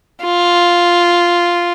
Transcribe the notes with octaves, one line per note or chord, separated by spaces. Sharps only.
F4